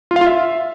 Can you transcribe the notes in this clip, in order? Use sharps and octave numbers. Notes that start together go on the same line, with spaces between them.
F4
F5
F4
E5